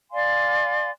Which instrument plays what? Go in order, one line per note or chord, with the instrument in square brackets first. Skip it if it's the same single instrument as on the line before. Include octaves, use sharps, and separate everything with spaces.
[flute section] D5 F5 G#5 C6